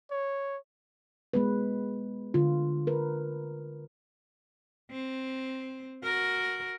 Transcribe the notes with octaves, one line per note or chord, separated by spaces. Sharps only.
C#5
G#3 B3 B4
D3 F4
A#4 B4
C4
F#4 A#4